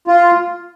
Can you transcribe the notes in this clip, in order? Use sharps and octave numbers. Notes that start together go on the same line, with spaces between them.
F4